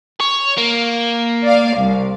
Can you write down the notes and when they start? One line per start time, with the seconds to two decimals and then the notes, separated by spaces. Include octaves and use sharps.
0.20 C#5
0.58 A#3
1.43 D5 F5
1.77 C2